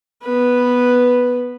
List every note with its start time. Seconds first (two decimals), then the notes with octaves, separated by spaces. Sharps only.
0.23 B3 B4